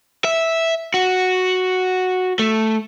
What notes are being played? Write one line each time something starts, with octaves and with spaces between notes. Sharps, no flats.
E5
F#4
A3